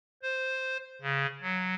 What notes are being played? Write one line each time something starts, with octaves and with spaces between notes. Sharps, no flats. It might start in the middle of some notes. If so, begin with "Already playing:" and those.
C5
C#3
F#3